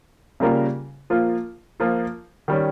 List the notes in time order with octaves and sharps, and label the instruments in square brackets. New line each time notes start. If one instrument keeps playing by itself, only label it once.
[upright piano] C#3 G3 A#3 F4 A#4
F3 A#3 F4
F3 A#3 F4
D#3 G3 C#4